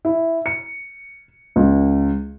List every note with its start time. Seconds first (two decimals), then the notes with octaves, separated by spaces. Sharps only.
0.05 E4
0.46 C#7
1.56 C#2